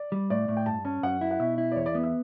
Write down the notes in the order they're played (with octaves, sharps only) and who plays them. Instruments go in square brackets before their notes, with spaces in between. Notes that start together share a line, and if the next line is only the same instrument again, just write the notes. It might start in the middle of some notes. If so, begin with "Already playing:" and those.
Already playing: [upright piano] D5
[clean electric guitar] G3
[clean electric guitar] A2 [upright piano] D5
[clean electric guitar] A2
[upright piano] G5
[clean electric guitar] G2 [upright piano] A5
[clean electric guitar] C#4 [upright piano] A5
[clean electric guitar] F#2 [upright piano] F#5
[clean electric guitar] E4
[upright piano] F#5
[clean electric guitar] B2 [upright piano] E5
[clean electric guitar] E4
[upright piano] D5
[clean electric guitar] E2 [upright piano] C#5
[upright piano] D5
[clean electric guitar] B3
[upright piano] E5